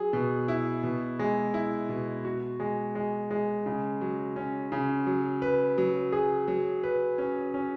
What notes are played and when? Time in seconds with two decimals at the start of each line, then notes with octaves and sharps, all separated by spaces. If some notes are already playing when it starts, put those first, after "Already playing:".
Already playing: F#3 G#4
0.13 B2
0.48 E4
0.83 B2
1.19 G#3
1.54 E4
1.89 B2
2.25 F#4
2.60 G#3
2.95 G#3
3.31 G#3
3.66 C#3
4.01 F#3
4.36 C#4
4.72 C#3
5.07 F#3
5.42 B4
5.78 F#3
6.12 G#4
6.48 F#3
6.83 B4
7.18 C#4
7.54 C#4